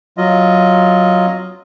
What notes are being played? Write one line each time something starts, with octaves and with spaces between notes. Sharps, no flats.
F#3 F4 D#5